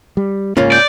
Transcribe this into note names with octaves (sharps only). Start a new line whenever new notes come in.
G3
G#2 C#3 A#3 C#4 F4
D5 G6